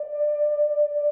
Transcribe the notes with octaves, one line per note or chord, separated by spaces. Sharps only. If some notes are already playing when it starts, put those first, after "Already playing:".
Already playing: D5
D5